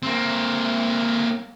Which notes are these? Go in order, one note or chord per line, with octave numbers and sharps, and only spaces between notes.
A#3 C4